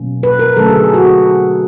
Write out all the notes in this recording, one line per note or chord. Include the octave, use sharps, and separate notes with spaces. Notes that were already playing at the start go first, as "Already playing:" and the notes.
Already playing: B2 F#3 A#3 C#4
B4
A#4
D3 F#3 A3 C#4 A4
G#4
F#4